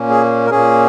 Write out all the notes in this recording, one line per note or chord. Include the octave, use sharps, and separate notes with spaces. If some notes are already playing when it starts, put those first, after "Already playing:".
Already playing: A#2 A#3 C#4
G#4
A#4
A#2 A#3 C#4 G#4